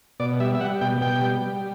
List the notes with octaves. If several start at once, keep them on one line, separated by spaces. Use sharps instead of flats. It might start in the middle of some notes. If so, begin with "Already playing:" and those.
B2 D5
G3 E5
E5
G3 F#5
B2 G5
B2 G5
G3
G3